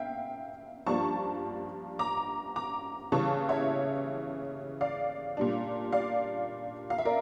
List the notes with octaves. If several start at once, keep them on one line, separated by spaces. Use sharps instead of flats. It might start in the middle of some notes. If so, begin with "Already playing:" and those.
Already playing: E5 F5 G5
G2 F3 A#3 D4 A5 C#6
A#5 D6
A#5 D6
C#3 E3 G3 A5 C#6
C#5 E5
D5 F5
A#2 G3 D4
D5 F5
F5
E5
A#4 D5